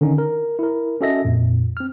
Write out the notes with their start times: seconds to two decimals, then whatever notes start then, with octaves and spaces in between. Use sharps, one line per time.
0.01 D3 D#3 C#4 D#4
0.18 A#4
0.59 E4 A#4
1.01 C#4 F#4 A4 D#5 E5 A#6
1.25 F2 A#2
1.77 C4 F6